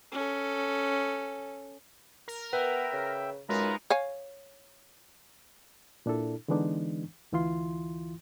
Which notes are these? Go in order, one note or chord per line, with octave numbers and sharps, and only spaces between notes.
C#4 A4
A#4
B3 B4 E5 G5
C#3
F#2 G#3 D#4 F4 B4 A#5
C#5 F5 G#5
A#2 D4 E4 A4
D3 E3 G#3 B3 D4 D#4
D2 E3 E4 F4 C6